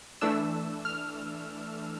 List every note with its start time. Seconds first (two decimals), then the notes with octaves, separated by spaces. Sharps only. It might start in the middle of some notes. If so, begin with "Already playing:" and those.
0.21 E3 A3 D4 E6
0.85 F6